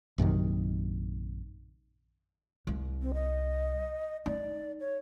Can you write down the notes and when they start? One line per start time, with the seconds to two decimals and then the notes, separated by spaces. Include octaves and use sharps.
0.18 A#1 F#2 C3 D#3
2.67 C2
3.02 C4
3.14 D#5
4.26 D#4 D5
4.80 C#5